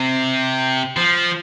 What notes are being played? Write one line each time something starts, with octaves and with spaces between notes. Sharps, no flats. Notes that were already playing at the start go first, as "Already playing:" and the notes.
Already playing: C3
F3